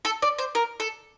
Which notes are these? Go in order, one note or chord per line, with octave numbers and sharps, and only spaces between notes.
A4
D5
C5
A#4
A4